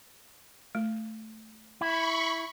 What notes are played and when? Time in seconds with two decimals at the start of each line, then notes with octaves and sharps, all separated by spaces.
0.75 A3
1.81 E4 B5 C#6